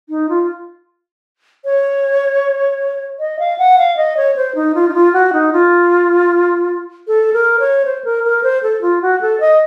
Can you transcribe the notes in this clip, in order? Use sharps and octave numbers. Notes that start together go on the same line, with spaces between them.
D#4
F4
C#5
D#5
F5
F#5
F5
D#5
C#5
C5
D#4
F4
D#4
F4
F#4
D#4
F4
A4
A#4
C#5
C5
A#4
A#4
C5
A4
F4
F#4
A4
D#5